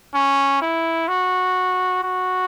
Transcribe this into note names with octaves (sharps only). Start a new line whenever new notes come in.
C#4
E4
F#4
F#4